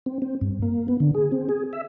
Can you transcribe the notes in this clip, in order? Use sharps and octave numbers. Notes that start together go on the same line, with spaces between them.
C4
C4
G2
A#3
B3
D3
G#4
C4
G#4
E5